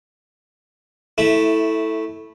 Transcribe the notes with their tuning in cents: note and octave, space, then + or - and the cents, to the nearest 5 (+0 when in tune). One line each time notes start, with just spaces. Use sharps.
A3 +0 E4 -15